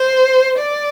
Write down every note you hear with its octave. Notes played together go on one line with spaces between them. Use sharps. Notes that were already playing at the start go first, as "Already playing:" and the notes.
Already playing: C5
D5